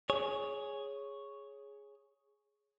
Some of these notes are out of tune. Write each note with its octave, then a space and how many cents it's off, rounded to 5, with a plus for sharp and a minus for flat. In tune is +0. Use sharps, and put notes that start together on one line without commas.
G#4 +0 C#5 +0